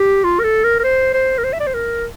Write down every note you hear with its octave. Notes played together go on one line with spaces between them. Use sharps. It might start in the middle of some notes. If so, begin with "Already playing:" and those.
Already playing: G4
F4
A#4
A4
A#4
A#4
C5
C5
A#4
C5
E5
D5
C5
A#4